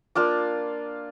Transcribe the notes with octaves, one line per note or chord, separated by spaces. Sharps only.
A#3 D4 F4 D6